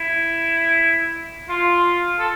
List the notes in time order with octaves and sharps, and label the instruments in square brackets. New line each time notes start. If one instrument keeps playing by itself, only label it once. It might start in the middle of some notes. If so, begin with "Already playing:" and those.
Already playing: [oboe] E4
F4
A4